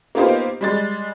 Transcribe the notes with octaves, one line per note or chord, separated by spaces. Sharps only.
A#3 B3 D#4 F4 G4 C5
G3 G#3 A6